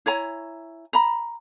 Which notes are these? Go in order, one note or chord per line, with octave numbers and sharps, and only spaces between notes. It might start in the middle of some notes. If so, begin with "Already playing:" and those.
E4 C#5 G#5 A#5
A#5 B5